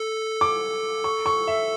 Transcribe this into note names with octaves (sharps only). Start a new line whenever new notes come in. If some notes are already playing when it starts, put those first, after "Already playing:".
Already playing: A4
D6
C#6
C#6
E5